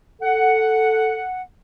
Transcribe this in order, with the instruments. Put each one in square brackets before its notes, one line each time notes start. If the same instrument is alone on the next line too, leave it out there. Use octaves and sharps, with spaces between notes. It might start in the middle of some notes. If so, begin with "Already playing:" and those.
[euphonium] A4 [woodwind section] F#5